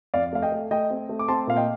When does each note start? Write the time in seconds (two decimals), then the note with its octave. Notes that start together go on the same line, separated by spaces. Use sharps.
0.13 F2 D5 F5
0.33 A3 F5
0.42 D#5 G5
0.52 A3
0.71 A3 D#5 G5
0.90 C4
1.09 A3
1.19 D6
1.28 C4 A5 C6
1.47 A#2 F5
1.57 D#5 G5